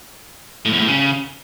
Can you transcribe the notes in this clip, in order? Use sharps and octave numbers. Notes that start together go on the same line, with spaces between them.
A2
E2
A2
C#3